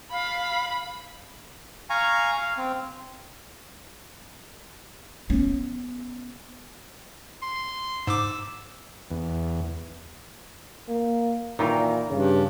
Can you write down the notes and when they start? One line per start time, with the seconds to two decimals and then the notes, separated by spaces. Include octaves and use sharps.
0.12 F5 B5
1.90 F5 G#5 A#5 C#6
2.37 F5
2.58 C4
5.30 B3 C#4
7.42 C6
8.07 G#2 D6 E6
9.11 E2
10.89 A#3
11.59 A#2 D#3 E3 A#4
12.10 G2 C#3